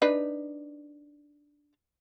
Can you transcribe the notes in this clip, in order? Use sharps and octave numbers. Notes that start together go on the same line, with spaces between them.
D4 D#4 B4